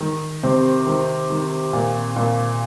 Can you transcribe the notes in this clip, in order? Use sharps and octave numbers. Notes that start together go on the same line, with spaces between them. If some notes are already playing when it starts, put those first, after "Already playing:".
D#3
C3 C4
D#3
D#3
A#2
A#2